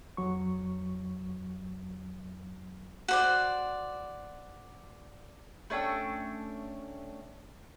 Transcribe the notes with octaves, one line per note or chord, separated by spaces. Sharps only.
F2 F#3 C#6
F#4 C5 D5
A3 C#4 D4 G5